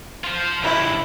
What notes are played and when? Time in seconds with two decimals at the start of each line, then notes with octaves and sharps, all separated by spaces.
0.24 F4 C5
0.63 C#2 G2 E4